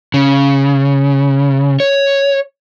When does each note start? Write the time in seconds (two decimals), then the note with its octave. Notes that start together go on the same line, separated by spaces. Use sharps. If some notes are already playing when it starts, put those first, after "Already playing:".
0.14 C#3
1.80 C#5